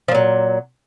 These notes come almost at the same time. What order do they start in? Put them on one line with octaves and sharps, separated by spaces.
F3 A#2 F#3